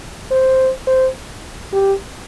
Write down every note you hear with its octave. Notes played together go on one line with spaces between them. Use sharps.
C5
C5
G4